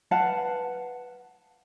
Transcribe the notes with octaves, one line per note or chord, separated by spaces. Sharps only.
B4 F5 F#5 A5